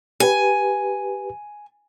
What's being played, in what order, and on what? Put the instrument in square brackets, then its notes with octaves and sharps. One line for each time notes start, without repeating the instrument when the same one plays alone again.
[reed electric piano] G4 B4 [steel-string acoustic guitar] G#5